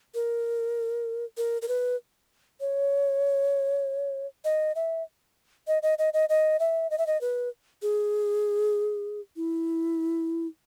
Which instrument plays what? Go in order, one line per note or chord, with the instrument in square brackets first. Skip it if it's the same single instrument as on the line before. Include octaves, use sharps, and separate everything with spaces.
[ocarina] A#4
A#4
A#4
B4
C#5
D#5
E5
D#5
D#5
D#5
D#5
D#5
E5
D#5
E5
D#5
B4
G#4
E4